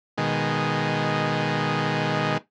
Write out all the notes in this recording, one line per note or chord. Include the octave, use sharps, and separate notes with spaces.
B2 D#3 G#3